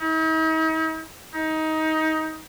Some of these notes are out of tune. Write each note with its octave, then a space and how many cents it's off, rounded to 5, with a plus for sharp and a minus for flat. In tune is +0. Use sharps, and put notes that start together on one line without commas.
D#4 +45
D#4 +20